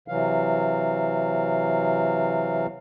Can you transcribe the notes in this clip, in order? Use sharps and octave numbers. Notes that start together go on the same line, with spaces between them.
C3 E3 F#3 F5